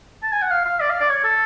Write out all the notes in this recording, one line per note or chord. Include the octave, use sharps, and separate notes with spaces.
A5
G#5
F#5
F5
F5
D5
F5
D5
C#5
A4